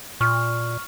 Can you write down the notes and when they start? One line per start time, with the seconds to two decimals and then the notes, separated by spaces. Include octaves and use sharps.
0.21 A#2 C#6 F6